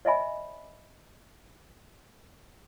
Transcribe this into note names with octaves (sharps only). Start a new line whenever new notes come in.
C#5 D#5 E5 G#5 B5